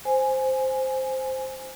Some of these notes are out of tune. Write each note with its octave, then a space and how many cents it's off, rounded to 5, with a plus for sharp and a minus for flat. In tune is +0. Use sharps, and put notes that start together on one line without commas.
C5 +0 G#5 +0